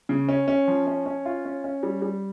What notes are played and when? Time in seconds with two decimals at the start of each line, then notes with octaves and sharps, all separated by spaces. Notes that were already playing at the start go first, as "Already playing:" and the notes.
0.09 C#3
0.28 C#4
0.48 C#4
0.68 F3
0.87 C#4
1.06 C#4
1.25 F4
1.45 C#4
1.64 C#4
1.83 G3
2.02 G3